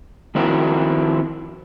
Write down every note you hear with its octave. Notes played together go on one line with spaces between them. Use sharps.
D#3 F3 C4 E4 F#4 A#4